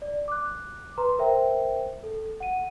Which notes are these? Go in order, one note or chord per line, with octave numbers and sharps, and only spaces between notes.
D5
D6 F#6
B4 A#5 C6
A#4 C5 E5 G5
A4
F#5 D#7